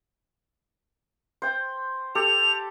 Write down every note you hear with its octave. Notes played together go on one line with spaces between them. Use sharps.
C5 G5
G4 A4 F7